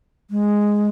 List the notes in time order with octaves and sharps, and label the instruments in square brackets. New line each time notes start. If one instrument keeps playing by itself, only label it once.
[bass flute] G#3